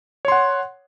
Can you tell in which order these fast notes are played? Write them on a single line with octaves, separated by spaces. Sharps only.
C#5 C6 F#5